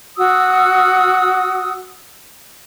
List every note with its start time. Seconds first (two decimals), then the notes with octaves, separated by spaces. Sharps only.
0.17 F#4 D#6 E6